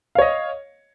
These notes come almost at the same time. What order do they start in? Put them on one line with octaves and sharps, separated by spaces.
F5 C#5 D#5